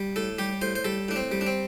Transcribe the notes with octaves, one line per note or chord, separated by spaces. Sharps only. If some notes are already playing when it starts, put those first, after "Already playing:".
Already playing: G3
A2 A4
G3 G4
A2 C5
C5
G3 A4
A2 D4
C4
G3
D4
C4